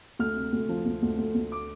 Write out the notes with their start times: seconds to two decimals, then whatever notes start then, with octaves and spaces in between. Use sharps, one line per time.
0.19 D2 F6
0.35 C3
0.53 D2
0.69 F3
0.86 D2
1.03 D2
1.18 D2
1.35 D2
1.52 D6